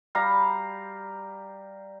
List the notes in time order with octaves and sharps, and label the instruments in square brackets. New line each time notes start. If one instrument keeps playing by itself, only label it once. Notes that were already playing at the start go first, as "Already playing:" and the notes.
[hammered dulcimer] G3 F5 A#5